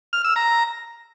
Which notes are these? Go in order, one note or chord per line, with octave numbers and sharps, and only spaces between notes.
F6
E6
A#5